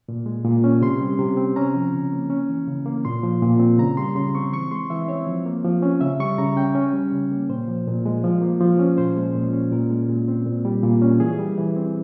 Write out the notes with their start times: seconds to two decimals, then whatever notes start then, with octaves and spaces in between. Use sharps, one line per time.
0.09 A#2
0.26 G#3
0.45 A#2
0.64 C#4
0.82 C3 C6
1.01 G3
1.19 C3
1.37 C4
1.56 C#4 A#5
1.75 F3
1.94 C#3
2.12 A#3
2.30 C#4
2.49 E3
2.67 C#3
2.86 A#3
3.05 A#2 C6
3.23 F3
3.42 A#2
3.60 C4
3.78 C#3 A#5
3.97 G3 C6
4.15 C#3 C6
4.35 C4 C#6
4.53 E3 C#6
4.71 G#3 C6
4.90 E3 E5
5.08 C4 C#5
5.27 F3
5.46 A#3
5.65 F3
5.82 C#4
6.01 C#3 E5
6.20 G3 C#6
6.38 C#3 A#5
6.56 C#4 G5
6.75 C#4
6.93 G3
7.12 C#3
7.32 A#3
7.49 A#2 C5
7.68 F3
7.87 A#2
8.06 G#3
8.24 F3
8.42 A#3
8.61 F3
8.79 C#4
8.98 A#2 C5
9.16 G#3
9.35 A#2
9.53 C#4
9.72 A#2 A#4
9.91 G#3
10.08 A#2
10.28 C4
10.46 A#2
10.65 G3
10.83 A#2
11.02 C#4
11.20 E3 G#4
11.39 G3
11.58 E3
11.76 C4